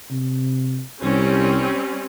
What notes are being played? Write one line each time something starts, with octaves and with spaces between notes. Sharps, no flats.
C3
C2 G3 C4 C#4